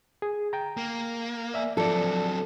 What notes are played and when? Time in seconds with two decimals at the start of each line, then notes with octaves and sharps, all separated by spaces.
0.22 G#4
0.53 G5 A#5
0.77 A#3
1.54 D5 E5 G#5
1.77 F3 F#3 C4 A4 D5